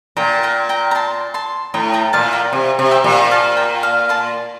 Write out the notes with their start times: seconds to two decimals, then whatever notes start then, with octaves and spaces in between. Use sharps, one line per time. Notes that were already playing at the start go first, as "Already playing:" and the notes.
0.17 A#2 G5 A#5
0.43 G5 A#5
0.69 G5 A#5
0.91 A#5
0.95 A5 C6
1.34 A5 C6
1.74 A2 G5 A#5
1.94 G5 A#5
2.13 A#2 F5 A5
2.33 G5 A#5
2.53 C3
2.79 C3
2.91 E5 G5
3.04 A#2
3.31 F5 A5
3.57 G5 A#5
3.83 F5 A5
4.09 A5 C6